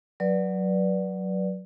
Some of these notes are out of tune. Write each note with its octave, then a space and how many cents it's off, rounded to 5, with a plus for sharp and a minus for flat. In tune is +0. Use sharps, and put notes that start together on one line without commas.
F#3 +0 B4 -15 D5 +0